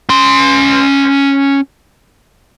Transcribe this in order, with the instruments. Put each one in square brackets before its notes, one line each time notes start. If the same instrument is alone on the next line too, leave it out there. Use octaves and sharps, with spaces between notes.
[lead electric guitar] C#4 C6